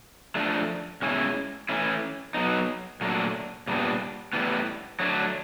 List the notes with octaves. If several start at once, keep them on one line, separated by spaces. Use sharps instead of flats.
F3 A3 D4
B2 G#3 C#4 E4
E3 A3 C#4 E4
F#3 B3 D#4
A#2 F#3 A3 D4
A#2 G3 B3 D4
A2 E3 G3 B3
F#3 A3 D4